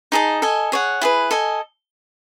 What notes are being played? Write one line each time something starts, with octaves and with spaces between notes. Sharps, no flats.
D#4 G#4 D#5 A5
A4 D#5 G#5
G#4 C#5 F#5
E4 G#4 B4
A4 D#5 G#5